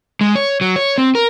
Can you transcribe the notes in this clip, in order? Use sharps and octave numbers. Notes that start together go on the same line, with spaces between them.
G#3
C#5
F#3
C#5
C4
A#4